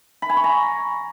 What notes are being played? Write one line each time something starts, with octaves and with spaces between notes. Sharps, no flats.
B5
G#5
C#6
A#5